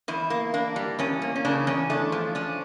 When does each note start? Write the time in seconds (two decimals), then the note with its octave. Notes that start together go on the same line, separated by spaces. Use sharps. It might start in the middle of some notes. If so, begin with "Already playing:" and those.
0.08 E2 E4
0.30 A#3
0.54 A#3 D4
0.76 G3
0.99 E2 C#4
1.22 A#3
1.36 C#4
1.45 C#3 D4
1.67 E2 C#4
1.90 A3 D4
2.12 F3
2.35 C#4 D4